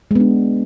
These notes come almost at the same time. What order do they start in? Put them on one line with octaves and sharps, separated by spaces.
G#3 B3 D4